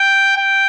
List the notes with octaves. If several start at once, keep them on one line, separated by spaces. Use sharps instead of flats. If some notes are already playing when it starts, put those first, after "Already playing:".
Already playing: G5
G5